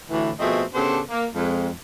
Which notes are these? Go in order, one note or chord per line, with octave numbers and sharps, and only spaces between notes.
D2 A2 E3
B2 F3 A3 C4 G#4 D#5
C#3 B3 D4 G4 A4 C5
A#3
F2 G#3